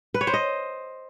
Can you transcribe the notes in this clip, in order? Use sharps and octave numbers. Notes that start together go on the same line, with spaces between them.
B4
C#5
C5
D#5